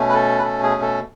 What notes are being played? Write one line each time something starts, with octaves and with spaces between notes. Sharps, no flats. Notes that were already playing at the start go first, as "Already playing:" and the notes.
Already playing: B2 A3 C#4
B4
A4
B4
A4
G#4
A4